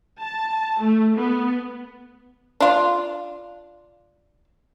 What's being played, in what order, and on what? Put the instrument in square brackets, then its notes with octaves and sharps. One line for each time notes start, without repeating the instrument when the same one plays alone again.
[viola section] A5
A3
B3
[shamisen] D4 F4